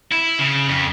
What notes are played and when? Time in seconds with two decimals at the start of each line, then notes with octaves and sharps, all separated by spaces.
0.11 E4
0.39 C#3
0.69 F2